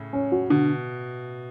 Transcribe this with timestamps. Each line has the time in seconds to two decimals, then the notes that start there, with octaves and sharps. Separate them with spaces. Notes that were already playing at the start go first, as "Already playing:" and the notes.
Already playing: A2 C#3
0.13 C#4
0.32 F#4
0.50 B2 D3